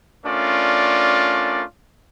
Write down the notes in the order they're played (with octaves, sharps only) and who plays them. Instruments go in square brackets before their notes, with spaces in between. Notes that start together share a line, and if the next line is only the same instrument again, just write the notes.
[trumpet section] A3 C#4 D4 F4 A#4 D5